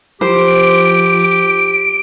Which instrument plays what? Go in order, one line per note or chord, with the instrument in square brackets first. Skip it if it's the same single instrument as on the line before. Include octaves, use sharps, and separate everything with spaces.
[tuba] F3 [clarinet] G4 [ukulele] C5 [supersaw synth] D7